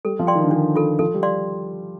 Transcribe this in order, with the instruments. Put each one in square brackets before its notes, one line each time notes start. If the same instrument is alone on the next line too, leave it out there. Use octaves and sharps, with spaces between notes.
[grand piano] G3 [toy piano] A4
[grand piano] F3
[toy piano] D5 G5 C6
[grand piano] D#3
D3
[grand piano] D#3 [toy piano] D4
[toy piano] F4 A4
[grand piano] F3 [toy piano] A4
[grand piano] G3
[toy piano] D5 F5 C6